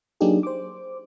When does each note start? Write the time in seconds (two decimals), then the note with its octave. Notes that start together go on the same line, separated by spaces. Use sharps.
0.21 F#3 A#3 D4 D#4 G4 G#4
0.43 C5 D6